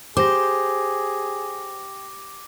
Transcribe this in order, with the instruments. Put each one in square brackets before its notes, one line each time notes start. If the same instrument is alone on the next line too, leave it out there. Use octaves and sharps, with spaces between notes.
[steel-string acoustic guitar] G4 [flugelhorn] G#4 [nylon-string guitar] C5 [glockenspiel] D6 A#6